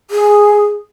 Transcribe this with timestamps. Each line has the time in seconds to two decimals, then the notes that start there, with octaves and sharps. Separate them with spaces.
0.11 G#4